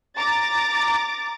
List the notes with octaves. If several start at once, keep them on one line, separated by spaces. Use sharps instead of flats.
A#5 D6 A6